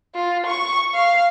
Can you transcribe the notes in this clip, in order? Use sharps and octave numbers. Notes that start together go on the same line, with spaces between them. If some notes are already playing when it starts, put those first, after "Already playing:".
F4
C#6
F5